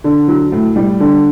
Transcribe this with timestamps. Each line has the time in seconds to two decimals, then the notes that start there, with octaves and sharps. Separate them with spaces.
0.04 D3
0.28 F#3
0.52 A2
0.76 G3
1.00 D3